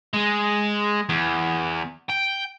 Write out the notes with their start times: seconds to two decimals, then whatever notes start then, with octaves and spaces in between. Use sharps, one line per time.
0.14 G#3
1.09 E2
2.09 G5